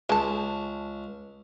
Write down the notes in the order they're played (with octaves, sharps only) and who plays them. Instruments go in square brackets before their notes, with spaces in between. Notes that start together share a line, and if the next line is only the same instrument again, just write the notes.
[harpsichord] C#2 [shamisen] G#3 A5